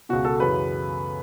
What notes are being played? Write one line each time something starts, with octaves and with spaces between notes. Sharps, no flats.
C#2 B2 F#4
A4
F#2 C#3 E3 B4